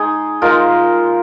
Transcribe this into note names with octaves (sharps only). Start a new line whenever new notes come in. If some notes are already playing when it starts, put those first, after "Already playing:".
Already playing: G#3 D#4 G#4
G#3 D#4 F4 A#4